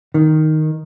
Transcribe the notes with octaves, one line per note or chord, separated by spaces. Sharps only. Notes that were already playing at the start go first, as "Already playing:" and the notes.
D#3